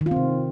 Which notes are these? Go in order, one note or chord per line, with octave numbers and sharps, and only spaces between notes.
D#3
F4
C4
C3